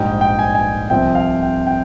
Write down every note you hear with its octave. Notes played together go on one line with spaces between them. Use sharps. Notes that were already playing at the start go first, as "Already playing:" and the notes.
Already playing: A#1 G#2 G3 G5
G5
G#5
G#5
C2 C3 F3 C4 G5
F5
G5
G5